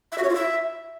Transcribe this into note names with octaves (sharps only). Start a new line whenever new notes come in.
E5
F#4
C#5
F4
E5